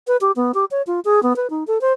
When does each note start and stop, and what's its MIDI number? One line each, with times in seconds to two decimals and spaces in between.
0.07 0.17 71
0.21 0.32 67
0.36 0.52 59
0.54 0.65 67
0.71 0.82 73
0.87 1.00 65
1.05 1.22 68
1.23 1.36 59
1.36 1.50 71
1.50 1.64 63
1.67 1.81 69
1.81 1.93 72